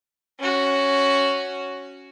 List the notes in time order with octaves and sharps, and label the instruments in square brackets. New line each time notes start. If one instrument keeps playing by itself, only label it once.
[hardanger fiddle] C#4 F#4